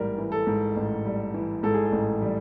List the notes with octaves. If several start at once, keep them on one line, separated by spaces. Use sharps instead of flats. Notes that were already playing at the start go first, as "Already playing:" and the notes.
Already playing: A1 G#2 E3 G3 A#4
E3
A4
G#2
A1
G3
E3
G#2 A4
G#4
A4
A1
G3